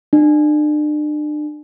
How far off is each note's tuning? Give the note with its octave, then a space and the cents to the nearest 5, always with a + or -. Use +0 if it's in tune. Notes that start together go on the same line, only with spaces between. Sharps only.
D4 +40